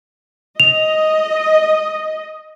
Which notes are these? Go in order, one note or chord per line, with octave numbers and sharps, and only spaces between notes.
D#5 F7